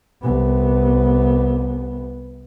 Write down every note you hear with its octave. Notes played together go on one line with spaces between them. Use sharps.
C2 B3